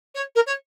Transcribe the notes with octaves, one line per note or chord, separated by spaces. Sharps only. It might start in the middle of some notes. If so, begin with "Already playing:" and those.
C#5
A#4
C#5